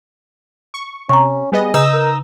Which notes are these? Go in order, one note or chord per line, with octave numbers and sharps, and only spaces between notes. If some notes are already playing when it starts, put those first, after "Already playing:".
C#6
C3 C#4 A#5 C#6
G3 B3 G#4 D#5
C#3 D#4 E6
A#4